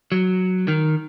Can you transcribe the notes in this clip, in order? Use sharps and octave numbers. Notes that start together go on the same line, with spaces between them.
F#3
D#3